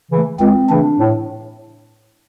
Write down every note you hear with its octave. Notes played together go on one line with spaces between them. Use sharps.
C#3 E3 A3
C#2 C4
C#3 E3 A3 D4
A2